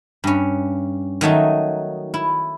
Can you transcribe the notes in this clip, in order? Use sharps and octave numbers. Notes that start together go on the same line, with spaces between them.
G2 C#4
D#3 F#3 A3 D#4
E4